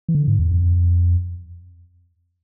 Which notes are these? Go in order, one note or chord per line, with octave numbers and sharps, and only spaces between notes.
E3
D3
G#2
E2
F2